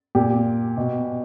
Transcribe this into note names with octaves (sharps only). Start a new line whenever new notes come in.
A#2 G4
B2